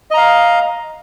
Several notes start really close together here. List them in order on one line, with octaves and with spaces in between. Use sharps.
D#5 A#5 F5